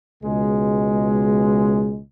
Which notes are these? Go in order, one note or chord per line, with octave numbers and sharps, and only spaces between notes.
C#2 B2 G#3